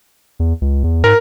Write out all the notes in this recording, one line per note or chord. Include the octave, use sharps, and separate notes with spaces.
E2
C#2
E2
G#2 A#4